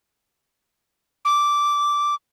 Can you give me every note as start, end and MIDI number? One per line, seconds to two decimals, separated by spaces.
1.25 2.15 86